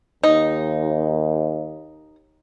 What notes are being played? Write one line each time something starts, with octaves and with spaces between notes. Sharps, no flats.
D#2 D#4